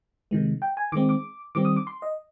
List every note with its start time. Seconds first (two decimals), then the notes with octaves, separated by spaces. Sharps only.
0.31 C3 D#3 G#3
0.62 G5
0.77 G#5
0.92 D#3 G#3 C4 D6
1.09 D6
1.55 D#3 G3 C4 D6
1.65 D#6
1.76 D6
1.87 C6
2.02 D#5